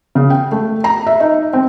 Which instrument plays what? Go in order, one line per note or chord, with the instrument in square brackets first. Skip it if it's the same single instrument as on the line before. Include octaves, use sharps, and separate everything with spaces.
[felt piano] C#3
G5
A3
A#5
E5
D#4
C4